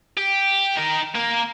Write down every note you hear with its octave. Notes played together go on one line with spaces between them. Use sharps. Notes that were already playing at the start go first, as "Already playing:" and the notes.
G4
D#4 A#4
A#3 A#4